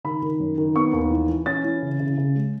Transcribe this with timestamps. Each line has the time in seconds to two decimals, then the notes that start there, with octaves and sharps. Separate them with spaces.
0.04 D#3 B5
0.22 D#3
0.40 F#2
0.58 D#3
0.76 B3 C#6
0.93 D#2
1.10 E3
1.29 E3
1.46 C#4 A6
1.64 E3
1.82 C#3
2.00 C#3
2.18 C#3
2.35 G#3